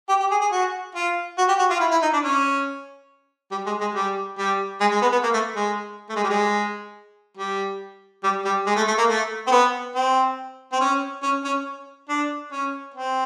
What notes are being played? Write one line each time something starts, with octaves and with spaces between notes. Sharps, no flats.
G4
G4
G#4
G#4
F#4
F4
F#4
G4
F#4
F4
E4
E4
D#4
D4
C#4
G3
G#3
G#3
G3
G3
G#3
G#3
B3
B3
A#3
A3
G#3
A3
G#3
G3
G#3
G3
G3
G3
G#3
A3
A3
A#3
A3
C4
B3
C4
C4
C#4
C#4
C#4
D4
C#4
C4